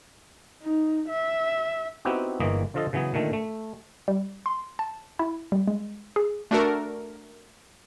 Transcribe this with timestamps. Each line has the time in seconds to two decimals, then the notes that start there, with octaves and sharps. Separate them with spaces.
0.63 D#4
1.09 E5
2.05 B3 C4 D#4 E4 F#4 G4
2.40 G1 E3 A#3 G#4 D#5
2.74 D3 F3 F4 A4 D#5
2.93 C#3 E3 F#3 B3 G#4
3.14 A#2 D3 D#3 A3
3.33 A3
4.08 G3
4.46 C6
4.79 A5
5.19 E4
5.52 G3
5.67 G#3
6.16 G#4
6.51 A3 D4 F#4 A4 A#4